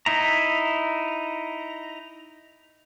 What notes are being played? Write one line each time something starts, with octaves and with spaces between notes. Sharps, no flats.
D#4 E4 A#5